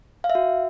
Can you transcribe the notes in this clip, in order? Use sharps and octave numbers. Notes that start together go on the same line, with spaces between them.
F5
E5
F#4